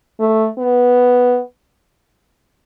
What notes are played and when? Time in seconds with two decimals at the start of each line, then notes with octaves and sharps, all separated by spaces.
0.20 A3
0.59 B3